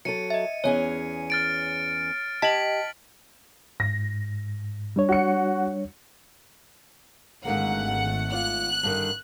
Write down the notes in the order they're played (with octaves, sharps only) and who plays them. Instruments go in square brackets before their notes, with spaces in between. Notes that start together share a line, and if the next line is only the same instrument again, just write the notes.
[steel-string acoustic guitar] F#3 A4 [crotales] C#7 D#7
[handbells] D#5 E5
[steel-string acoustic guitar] E2 C#4 G#4 [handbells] C#5
[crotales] F6 A6 D7
[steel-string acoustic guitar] G4 [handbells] D#5 A5 [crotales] B6 F#7
[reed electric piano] G#2 [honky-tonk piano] A#6
[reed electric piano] G3 D4 C#5
[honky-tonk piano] F#4 C#7
[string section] G#1 A3 F#5 [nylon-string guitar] G#2 D3 A#3
[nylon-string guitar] F4 D5 [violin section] F#6
[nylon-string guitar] G2 D3 D#3